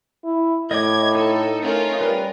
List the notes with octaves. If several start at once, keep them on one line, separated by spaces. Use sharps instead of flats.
E4
A2 D#5 D6 G#6
D#4 A4
A3 C#4 F4 A#4
G3 A#4 B4